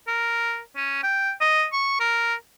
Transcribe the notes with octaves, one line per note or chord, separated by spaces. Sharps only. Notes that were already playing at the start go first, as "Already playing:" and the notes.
A#4
C#4
G5
D#5
C#6
A#4